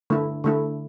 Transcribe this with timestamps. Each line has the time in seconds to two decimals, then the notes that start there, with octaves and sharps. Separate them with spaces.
0.10 D3 A3 E4
0.44 D3 A3 E4